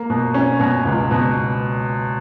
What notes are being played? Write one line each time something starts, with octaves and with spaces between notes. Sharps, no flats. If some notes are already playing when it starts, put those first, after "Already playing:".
Already playing: A#3
B2
C#4
B2
C#2
B2